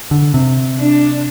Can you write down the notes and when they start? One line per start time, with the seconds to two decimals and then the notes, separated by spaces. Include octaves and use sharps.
0.11 D3
0.34 C3
0.78 D4